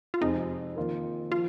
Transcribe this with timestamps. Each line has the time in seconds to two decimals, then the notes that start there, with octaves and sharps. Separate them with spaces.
0.14 F4
0.21 F2 C3 G#3 C4 D#4 G#4
0.76 D#3 A#3 F4 A#4
1.32 F3 F4